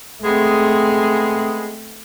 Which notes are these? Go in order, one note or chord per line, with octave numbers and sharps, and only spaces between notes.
G#3 A3 B3 C4 G#4